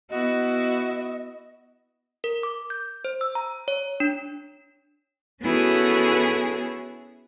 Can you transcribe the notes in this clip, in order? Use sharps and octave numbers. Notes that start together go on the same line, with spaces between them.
B3 E4 F#4 D#5
A#4
D6
G6
C5
E6
A#5
C#5
D4
B3 C#4 E4 F#4 G#4 A4